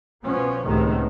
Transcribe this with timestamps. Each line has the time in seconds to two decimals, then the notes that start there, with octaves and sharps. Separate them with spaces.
0.22 B2 F3 B3 C#4
0.64 C#2 A2 C3 D#3 B3